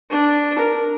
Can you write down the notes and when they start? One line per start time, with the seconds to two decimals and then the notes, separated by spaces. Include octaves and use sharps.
0.10 D4
0.58 A#4